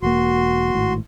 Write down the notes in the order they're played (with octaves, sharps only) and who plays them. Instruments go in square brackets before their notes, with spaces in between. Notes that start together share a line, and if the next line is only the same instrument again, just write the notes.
[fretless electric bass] E1 A#3 [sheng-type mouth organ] F#4 C6
[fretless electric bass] G#1 A2